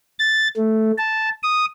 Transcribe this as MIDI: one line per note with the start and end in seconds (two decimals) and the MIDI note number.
0.19 0.48 93
0.57 0.92 57
0.98 1.29 81
1.43 1.66 87